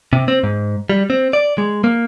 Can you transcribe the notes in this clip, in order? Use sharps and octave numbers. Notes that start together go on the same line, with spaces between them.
C3
C4
G#2
G3
C4
D5
G#3
A#3